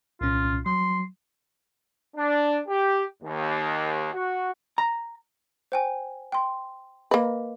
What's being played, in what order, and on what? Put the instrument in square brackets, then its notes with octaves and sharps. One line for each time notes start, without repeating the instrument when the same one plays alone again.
[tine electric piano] C2 A#2 C#4 [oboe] F4
[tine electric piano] F#3 [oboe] C6
[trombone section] D4
G4
D#2
F#4
[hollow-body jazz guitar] A#5
[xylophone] C5 G5 G#5
G5 C6
[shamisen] A#3 B4 [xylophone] D#5